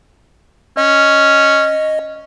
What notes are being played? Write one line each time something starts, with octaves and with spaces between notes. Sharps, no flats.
C#4 D#5